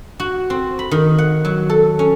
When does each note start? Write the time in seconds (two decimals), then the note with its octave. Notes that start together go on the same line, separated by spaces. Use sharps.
0.20 F#4
0.50 C4
0.79 B5
0.91 D#3
1.18 F#5
1.45 F#3
1.70 A4
1.99 C#4